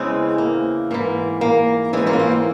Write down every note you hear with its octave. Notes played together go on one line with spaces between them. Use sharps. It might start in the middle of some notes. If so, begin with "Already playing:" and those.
Already playing: E2 C#3 E3 G#3 C4
A#3
G#2 E3 A#3
A#3
G#2 E3 G#3 C4
A#3 C#4
F4
C4 E4
A#3